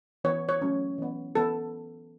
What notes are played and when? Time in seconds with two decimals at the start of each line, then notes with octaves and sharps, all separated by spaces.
0.24 E3 B3 C#5
0.49 C#5
0.62 F#3 A3 C#4
0.98 E3 B3
1.35 E3 B3 A4